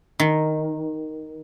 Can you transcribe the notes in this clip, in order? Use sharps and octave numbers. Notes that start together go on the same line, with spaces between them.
D#3